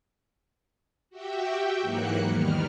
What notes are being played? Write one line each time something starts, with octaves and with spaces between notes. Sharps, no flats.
F#4 G4 E5 G5
G#2 E3 F#3 A#3 F#6 C#7
E2 D#3 G3 F6